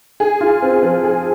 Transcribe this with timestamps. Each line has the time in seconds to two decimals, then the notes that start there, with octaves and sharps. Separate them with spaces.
0.20 G#4
0.41 F4
0.62 C4
0.83 F3
1.04 G#4